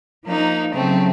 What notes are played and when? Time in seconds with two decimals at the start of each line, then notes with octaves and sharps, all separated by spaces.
0.24 F3 A#3 D#4
0.74 C#3 F#3 A3 C4